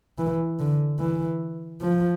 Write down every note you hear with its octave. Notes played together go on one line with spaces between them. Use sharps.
E3
D3
E3
F3